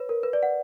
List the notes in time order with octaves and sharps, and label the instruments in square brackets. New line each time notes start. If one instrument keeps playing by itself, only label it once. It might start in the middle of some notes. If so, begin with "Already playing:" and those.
Already playing: [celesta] B4 C#5
A#4
B4
D5
F#5